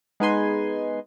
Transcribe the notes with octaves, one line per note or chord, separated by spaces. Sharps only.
G#3 B3 D#4 B4 G#5 C6